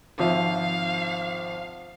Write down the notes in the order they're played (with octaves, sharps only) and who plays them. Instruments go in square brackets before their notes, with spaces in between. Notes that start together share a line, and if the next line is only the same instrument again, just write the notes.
[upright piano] G#1 F3 E5 [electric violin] F5